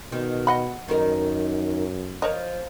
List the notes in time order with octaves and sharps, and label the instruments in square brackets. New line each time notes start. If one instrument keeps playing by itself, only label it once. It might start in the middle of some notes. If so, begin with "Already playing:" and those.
[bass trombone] B2 [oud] D#3
[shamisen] D#5 F#5 B5
[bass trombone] F#2 [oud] D#3 D#4 A#4
[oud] F3 [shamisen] A#4 C#5 D#5